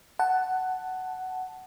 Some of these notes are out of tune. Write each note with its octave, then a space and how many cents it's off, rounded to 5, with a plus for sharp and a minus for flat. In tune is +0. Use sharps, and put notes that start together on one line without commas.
F#5 +10 A5 +0